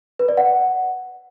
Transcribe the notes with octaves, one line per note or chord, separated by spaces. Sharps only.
B4
D5
F#5